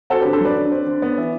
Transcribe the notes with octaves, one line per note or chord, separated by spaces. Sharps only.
C4 F#4 A4
D3 G4 B4
A4 C5
F#3 B4 D5
D3
C4
D3
B3
E3